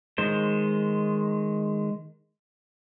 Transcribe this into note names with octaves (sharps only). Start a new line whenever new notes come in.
D#3 G#3 C5